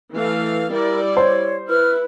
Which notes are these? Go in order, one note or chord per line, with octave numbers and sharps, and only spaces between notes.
E3 A3 F5
G3 E4 A#4 D5
C5 C#5
E4 B4 F6